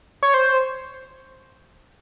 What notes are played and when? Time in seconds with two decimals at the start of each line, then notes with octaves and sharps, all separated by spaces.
0.23 C#5
0.34 C5